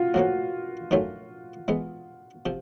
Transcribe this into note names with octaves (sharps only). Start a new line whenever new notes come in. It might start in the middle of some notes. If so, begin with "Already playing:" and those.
Already playing: F4 F#4
A2 F3 A#3 C#4 F#4
D#3 F#3 A3 C#4 F4
E3 G#3 B3
C3 F3